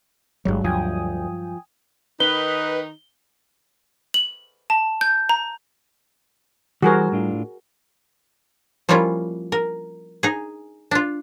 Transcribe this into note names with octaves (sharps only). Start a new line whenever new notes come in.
G1 G2 F#3 G#3
D2 F3 G5 G#5 D#6
D#3 D#4 B4 G7
F#7
A5
G6
A#5
E3 G3 F#4 G#4 A#4 C5
A2 D4 F4
F3 G3 A#3 C#4 E4 F4
A#4
D#4 G#4
D4 F4